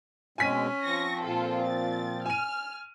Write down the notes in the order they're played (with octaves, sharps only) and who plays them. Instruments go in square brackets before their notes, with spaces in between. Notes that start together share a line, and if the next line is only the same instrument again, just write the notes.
[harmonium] B2 G#3 C4 [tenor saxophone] C#4 [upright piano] G#5 B6 D#7
[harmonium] F3 C4 [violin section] C#6 A#6
[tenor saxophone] A#2 [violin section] F4 A4
[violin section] A6
[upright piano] G#5 D#7 [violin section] F6